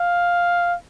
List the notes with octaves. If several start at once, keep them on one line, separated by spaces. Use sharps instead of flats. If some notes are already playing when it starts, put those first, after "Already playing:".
Already playing: F5